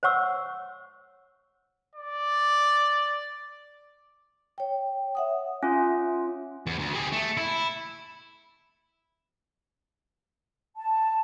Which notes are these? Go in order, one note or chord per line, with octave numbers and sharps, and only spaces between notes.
C5 C#5 F#5 C#6 E6
D5
C#5 G5
E5 F#5 D#6
C#4 F4
E2
D2
G3 G#4
A3
E4
A5